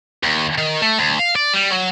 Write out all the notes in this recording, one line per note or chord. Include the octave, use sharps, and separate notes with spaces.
D#2
D#3
A3
D2
F5
D5
G3
F#3